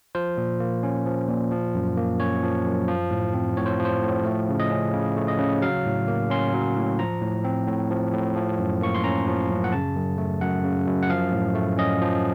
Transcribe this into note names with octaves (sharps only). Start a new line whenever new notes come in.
F3 C5
A#2
A#3
C#4
F3
A#2
F3
F#2
A#3
C#4 C#5
F3
F#2
F3
A2
C4
A2 C#5
C5
F3
C5
A2
A3
C#3
D#5
C#4
C#3
A3
D#5
C#3
F#3 F5
A2
A#3
C#4 C6
F#3
A2
F3 A#5
A2
C4
A2
F3
A2
F3
F#2
A#3 C#6
C6
C#4 A#5
F3
F#2
F#5
C#3 A5
F#2
A3
F#2 F#5
C#3
F#2
F#5
F3 F5
A2
A3
C#4 D#5
F3